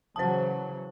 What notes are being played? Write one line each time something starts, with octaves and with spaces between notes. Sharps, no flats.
C#3 E3 F#3 C5 A5